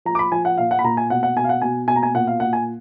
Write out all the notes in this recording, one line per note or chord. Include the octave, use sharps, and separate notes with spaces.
F3 A#5
D6
B5
F3 G#5
F#5
A#2 F5
F#5
B5
A#2 A#5
G#5
B2 F#5
F#5
B2 G#5
F5
F#5
B2 G#5
B2 G#5
A#5
G#5
A#2 F#5
F5
A#2 F#5
G#5